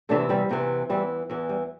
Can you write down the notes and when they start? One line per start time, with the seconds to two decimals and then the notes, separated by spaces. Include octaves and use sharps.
0.09 E2 C3 E3 A3 D4
0.29 G3 C4
0.49 E2 C3 E3
0.89 E2 E3 G3 C4
1.30 E2 E3
1.49 G3